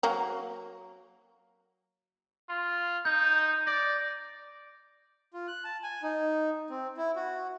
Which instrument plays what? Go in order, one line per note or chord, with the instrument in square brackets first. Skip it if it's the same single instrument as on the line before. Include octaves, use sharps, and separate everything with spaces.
[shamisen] F#3 A#3 A#5
[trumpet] F4
[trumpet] D#4 [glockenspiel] G6
[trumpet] D5 [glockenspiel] A#6
[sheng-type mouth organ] F4
F#6
A5
G#5
D#4
C4
E4
F#4